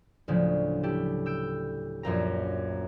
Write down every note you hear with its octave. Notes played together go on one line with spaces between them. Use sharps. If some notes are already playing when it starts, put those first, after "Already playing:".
D2 A2 C#3 F3 F#3
E4 G4 A4
E6 G6 D7
A#1 F#2 A#2 A#5